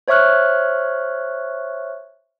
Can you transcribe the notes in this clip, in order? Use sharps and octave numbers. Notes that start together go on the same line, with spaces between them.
C5 C#5 E5 C#6 F6 F#6